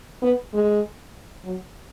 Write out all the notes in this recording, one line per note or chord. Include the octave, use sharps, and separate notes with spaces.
B3
G#3
F#3